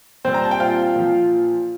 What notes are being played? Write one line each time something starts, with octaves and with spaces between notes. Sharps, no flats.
A#2 G3 C4 C5
A#5
A5
G5
F4 F5
A#2 F3